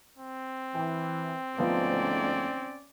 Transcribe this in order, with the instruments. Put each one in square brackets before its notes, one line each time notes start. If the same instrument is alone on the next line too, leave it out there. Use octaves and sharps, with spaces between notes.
[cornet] C4
[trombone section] E3 [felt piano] G5
[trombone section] D2 G#2 A3 [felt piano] F3 B3 [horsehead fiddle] C#4 D5